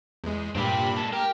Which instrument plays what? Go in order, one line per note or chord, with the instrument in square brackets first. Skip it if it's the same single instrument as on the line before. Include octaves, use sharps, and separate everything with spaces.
[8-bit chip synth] E2 G#3
[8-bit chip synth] G2 A#2 B5 [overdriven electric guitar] C4 G4
[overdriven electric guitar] G#3 A4
[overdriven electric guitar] G4 [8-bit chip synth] A#4